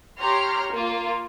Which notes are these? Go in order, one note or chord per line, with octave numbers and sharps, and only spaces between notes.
G4 C#5 A#5 C6 F6
A#3 F4